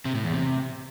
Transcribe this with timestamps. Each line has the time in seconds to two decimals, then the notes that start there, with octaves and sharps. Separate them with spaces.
0.05 C3
0.15 A2
0.24 E2
0.33 C3